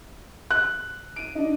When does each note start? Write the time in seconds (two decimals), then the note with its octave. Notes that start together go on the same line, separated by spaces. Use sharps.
0.51 F#6
1.16 D7 D#7
1.35 D4 D#4